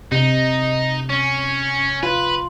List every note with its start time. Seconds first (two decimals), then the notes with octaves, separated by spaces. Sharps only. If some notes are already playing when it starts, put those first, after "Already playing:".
0.12 C3 D#4
1.09 C#4
2.03 F4 B4